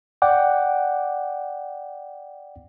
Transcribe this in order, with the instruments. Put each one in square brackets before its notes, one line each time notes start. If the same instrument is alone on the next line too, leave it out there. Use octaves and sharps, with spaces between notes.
[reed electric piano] D5 F#5 G5 D6